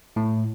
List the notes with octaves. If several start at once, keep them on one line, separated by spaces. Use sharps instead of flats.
A2